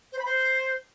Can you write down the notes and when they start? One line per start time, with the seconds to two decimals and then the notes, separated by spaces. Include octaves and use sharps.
0.12 C5
0.19 B5
0.26 C5